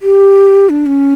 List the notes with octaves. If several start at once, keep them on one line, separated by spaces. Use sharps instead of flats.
G4
D4
C#4